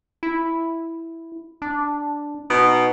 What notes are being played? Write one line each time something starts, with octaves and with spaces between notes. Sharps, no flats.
E4
D4
B2 D#4